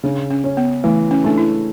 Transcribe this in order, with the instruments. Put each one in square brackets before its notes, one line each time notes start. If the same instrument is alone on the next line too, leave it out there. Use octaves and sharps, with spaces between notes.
[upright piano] C#3 [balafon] D4
[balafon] C#4
[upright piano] C#4
[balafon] B3
[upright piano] E3 [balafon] A3
[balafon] C#4
[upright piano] A3 [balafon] D4
[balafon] E4